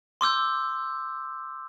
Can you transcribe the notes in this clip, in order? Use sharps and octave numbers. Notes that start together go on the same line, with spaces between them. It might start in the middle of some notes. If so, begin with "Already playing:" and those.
C6 D6 E6 G6